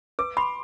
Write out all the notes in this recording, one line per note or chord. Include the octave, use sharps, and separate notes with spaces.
B4 D6
B5 C6